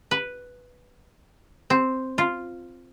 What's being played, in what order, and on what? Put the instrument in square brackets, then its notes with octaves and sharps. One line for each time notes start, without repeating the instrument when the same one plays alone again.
[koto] B4
C4
F4